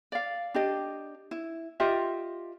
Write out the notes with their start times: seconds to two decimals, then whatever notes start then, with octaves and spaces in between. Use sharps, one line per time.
0.12 D5 F5
0.54 D4 G4 D#5
1.31 E4
1.80 F4 G4 D#5 E5